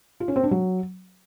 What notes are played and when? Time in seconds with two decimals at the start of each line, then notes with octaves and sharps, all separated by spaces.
0.20 F4
0.28 C#4
0.36 C4
0.43 D4
0.51 F#3